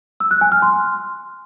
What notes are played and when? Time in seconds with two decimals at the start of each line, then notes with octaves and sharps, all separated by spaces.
0.20 E6
0.31 F#6
0.41 G#5
0.52 F6
0.62 C6